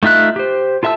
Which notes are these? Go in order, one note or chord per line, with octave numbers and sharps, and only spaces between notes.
A3 D#4 F4 E5 F#6
G4 C5
F4 A4 E5 A5 E6